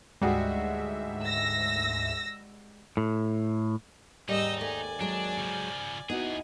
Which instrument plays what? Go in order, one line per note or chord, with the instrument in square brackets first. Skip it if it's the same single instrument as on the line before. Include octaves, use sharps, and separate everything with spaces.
[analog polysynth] D2 G#2 E5 [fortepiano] G3 F#4 G#4 [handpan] G#3
[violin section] E6 A#6
[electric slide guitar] A2
[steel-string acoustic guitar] D#2 G#2 A#4 [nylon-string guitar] G3 [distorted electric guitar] D#4 [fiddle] D#5 E6
[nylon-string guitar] A3 [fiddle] D5 G#5
[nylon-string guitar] F#3 G#3 [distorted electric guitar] D4
[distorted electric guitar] C#3 F3
[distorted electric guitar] D#2 G#4 [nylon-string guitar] B3 [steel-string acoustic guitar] D#4 E4 F#4